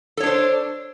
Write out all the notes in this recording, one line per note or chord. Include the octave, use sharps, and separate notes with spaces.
D4 A4 C5 C#5